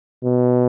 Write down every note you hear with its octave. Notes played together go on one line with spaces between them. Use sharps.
B2